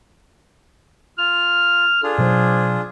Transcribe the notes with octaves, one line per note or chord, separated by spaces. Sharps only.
F4 F6
D4 F4 G#4 A4
B2 F#3 C5